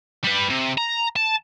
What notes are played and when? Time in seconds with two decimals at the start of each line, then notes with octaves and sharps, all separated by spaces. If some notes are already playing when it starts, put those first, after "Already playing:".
0.24 G3 B4
0.50 C3
0.78 A#5
1.16 A5